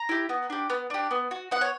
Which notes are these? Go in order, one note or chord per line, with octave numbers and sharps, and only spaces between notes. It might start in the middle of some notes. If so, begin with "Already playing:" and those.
Already playing: A#5
E4 G4
B3
D4 G4
B3
D4 G4
B3
F#4
B3 F#5
C#5